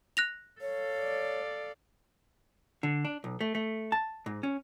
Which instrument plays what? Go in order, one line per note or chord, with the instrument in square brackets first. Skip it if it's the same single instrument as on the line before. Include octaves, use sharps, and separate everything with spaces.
[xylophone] F#6 A#6 F7
[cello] A4 F5 [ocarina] C#5
[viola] D5
[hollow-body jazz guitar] D3
D4
B1
A3
A3
A5
G#2
C#4